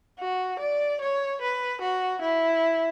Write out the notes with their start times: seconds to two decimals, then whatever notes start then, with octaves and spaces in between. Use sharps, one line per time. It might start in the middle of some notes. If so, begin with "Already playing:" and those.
0.19 F#4
0.60 D5
1.01 C#5
1.41 B4
1.81 F#4
2.22 E4